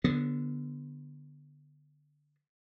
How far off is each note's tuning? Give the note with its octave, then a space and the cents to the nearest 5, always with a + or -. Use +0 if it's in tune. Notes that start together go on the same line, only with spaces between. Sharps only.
D3 +0 F#3 -30 B3 -10